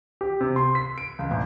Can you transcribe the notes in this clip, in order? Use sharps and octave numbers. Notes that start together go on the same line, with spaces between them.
G4
C3
C6
B6
D7
C#2
A1